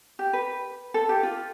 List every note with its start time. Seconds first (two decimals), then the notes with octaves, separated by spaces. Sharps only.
0.19 G4
0.33 B4
0.94 A4
1.09 G4
1.23 F4